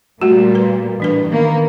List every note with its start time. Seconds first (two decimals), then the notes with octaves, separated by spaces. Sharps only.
0.22 A#2 G3 A3 A#3 F#4
0.55 B4
1.00 A2 E3 G3 D4 B4
1.30 D#3 A#3 B3